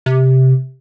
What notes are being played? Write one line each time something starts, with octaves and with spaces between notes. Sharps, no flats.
C3